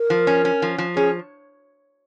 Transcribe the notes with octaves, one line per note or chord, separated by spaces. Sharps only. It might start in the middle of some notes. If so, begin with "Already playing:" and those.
Already playing: A#4
F3
C#4
C#4
F3
F3
C#4 G#4